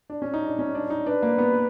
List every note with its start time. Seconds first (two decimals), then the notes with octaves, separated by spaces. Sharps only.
0.10 D4
0.22 C#4
0.34 D#4
0.46 D4
0.59 C#4
0.75 D4
0.90 D#4
1.06 D4 B4
1.23 A#3
1.38 B3